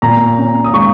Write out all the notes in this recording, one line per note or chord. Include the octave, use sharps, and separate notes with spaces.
A#2 A#5
C#4
D#6
G#3 C#6